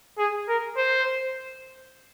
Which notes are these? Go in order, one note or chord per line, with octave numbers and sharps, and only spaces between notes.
G#4
A#4
C5